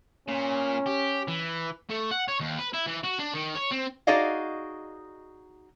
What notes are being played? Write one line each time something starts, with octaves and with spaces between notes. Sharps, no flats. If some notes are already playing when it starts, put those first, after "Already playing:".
A#2 C#4
G4
E3
A3
F#5
C#5
D#2
B4
E4
E3
F#4
D4
D#3
C#5
C4
D#4 F#4 G#4 D5 D#5 F5